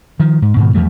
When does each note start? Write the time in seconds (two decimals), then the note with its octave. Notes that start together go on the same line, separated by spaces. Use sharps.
0.20 D#3 F3
0.42 G#2
0.56 G#2 B2 D#3
0.74 E2 F3 G3 A3